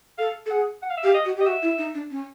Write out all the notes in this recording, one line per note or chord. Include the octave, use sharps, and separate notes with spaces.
A4 F5
A4
G#4 F#5
F#5
F5
E5
G4 F5
D#5
F#4
G4 D#5
F#4 E5
E4
D#4
D4
C#4